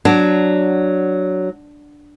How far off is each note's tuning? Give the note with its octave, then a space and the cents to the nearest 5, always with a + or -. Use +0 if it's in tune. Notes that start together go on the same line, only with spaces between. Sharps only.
F#3 +0 D4 +0